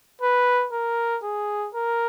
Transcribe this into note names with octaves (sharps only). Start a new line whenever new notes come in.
B4
A#4
G#4
A#4